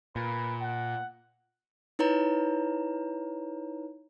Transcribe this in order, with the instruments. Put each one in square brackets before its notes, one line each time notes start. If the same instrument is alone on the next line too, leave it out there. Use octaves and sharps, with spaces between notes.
[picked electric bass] A#2 [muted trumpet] B4
[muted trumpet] F#5
[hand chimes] D#4 E4 B4 C#5 A#5